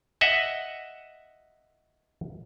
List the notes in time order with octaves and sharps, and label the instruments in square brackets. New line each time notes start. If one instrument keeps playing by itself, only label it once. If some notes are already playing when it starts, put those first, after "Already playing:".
[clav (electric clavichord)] D#5 E5 F#5